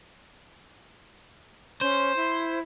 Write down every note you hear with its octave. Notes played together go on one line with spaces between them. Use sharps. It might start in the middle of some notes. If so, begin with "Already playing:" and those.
C#4 C5
E4